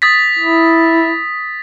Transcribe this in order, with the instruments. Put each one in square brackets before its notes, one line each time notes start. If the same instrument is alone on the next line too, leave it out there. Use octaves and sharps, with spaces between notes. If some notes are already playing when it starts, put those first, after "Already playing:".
[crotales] D#6 A6 B6
[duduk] E4